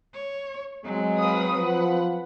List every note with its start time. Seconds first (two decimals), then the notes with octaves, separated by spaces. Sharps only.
0.14 C#5
0.85 F#3 G#3 C4
1.18 B4 F5 D#6
1.58 F3 B4 F#5